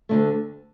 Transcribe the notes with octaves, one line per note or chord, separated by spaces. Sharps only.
D2 D3 A3